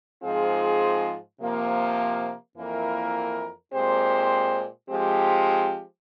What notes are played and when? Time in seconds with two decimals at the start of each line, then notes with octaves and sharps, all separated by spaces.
0.23 G#2 F3 C4 F4 G#4
1.40 C3 F3 A#3
2.57 F2 E3 A#3 E4 A#4
3.73 A#2 G#3 C4 G4 C5
4.89 F3 G#3 C4 G4